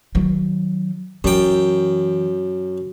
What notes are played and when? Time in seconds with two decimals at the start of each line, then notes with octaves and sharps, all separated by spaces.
0.15 D#3 F#3
1.24 F#2 E3 G5